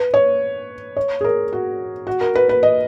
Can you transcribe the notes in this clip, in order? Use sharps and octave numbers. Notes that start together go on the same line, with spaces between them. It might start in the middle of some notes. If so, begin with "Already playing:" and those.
Already playing: B4
C#5
C#5
G#4
A#4
F#4
F#4
A#4
B4
B4
D#5